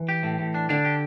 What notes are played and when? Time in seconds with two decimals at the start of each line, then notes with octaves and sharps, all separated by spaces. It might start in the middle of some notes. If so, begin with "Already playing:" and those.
Already playing: E3
0.09 G4
0.23 A2
0.39 A2
0.54 D4
0.69 D3 D4
0.85 G4